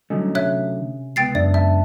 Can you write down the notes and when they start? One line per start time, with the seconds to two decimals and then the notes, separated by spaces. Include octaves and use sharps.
0.10 D3 F#3 G3 A3 C#4 D#5
0.35 C3 C#5 E5 F#6
1.16 C#2 B3 G5 A6 C7
1.35 F#2 D4 D5 E5 A6
1.54 E5 A5